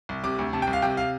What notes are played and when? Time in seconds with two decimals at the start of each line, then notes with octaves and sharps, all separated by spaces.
0.09 C2
0.24 C3 D6
0.39 D2
0.53 C3 A5
0.62 G5
0.67 C2
0.73 F5
0.82 C3 G5
0.97 F5